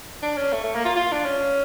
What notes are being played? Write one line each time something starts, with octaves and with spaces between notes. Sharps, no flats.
D4
C#4
A3
A3
A#3
F4
F4
D4
C#4